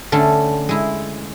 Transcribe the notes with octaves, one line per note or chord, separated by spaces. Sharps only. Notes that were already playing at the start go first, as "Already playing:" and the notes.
D3 A3 C#4
G#3 E4